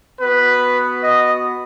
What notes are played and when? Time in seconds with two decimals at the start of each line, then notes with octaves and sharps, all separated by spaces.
0.21 B3 F#4 B4
1.03 D#5